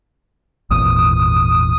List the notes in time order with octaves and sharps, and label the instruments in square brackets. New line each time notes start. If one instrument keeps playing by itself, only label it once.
[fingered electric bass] G#1 E2 A#2 [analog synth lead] D#6